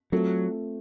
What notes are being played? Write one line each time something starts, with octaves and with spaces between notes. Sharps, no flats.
F#3 A3 C4 F4 A4